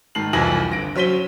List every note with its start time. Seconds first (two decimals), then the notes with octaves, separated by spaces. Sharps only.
0.15 G#2 D#3 A5 C7 F#7
0.33 C2 F2 E3 G#5 A#6 F#7
0.70 G1 A#6 D7
0.96 F#3 C#4 C5 B6 D#7 G7